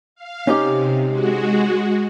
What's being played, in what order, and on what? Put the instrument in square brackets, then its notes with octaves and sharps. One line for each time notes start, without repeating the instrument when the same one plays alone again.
[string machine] F5
[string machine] C3 [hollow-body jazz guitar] C#4 D#4 G4
[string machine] G#3 F#4